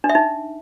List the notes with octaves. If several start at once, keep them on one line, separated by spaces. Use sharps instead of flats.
D4
E5
D#4